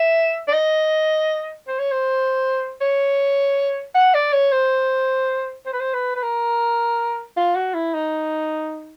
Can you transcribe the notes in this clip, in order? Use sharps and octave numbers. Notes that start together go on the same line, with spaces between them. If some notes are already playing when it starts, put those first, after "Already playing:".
Already playing: E5
D5
D#5
C5
C#5
C5
C#5
F#5
D5
C#5
C5
C5
B4
C5
B4
B4
A#4
F4
F#4
E4
D#4